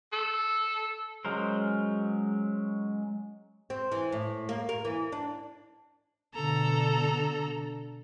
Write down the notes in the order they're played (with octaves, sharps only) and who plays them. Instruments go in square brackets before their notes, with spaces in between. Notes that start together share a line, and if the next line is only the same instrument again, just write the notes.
[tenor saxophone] A4
[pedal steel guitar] F#3 G#3 C#4 A#4 C5
[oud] C4
E3
A2
A#3
A#4
E3
D4
[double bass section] B2 D3 [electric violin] A4 A#5